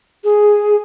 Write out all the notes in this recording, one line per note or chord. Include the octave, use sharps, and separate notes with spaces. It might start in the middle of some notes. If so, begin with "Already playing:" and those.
G#4